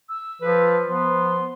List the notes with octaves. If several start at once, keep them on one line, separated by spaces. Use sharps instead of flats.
E6
F3 B4
F3 B3 C6